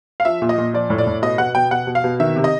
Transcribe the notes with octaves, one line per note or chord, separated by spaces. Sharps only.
F5
F3 E5
A#2
D#5
A#2
F3 D5
A2
D5
A2
B2 D#5
B2 F#5
B2 G5
B2 F#5
B2
F5
B2
D#3 E5
C3
D#5